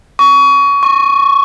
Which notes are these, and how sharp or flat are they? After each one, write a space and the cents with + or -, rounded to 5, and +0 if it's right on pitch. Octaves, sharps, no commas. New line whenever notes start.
C#6 +25
C#6 -20